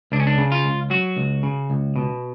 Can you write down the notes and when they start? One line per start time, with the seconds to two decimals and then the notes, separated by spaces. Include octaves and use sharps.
0.12 C#2 D4
0.20 C#4
0.27 D4
0.38 C#3
0.52 F4
0.64 C#2
0.90 F#3 F#4
1.17 C#2
1.43 C#3
1.70 C#2
1.96 B2